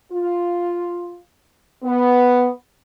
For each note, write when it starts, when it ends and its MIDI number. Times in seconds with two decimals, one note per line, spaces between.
0.12 1.20 65
1.83 2.49 59